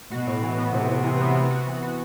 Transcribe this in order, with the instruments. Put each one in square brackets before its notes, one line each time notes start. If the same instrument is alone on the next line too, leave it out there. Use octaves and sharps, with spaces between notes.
[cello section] B2 [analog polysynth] F#4
[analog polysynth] A2
E3
B3
[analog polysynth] A2 [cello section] C3
[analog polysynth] A2
E3
B3
B3
F#4
E3
F#4